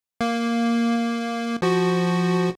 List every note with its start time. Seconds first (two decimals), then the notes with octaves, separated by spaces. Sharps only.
0.21 A#3
1.62 F3 F#4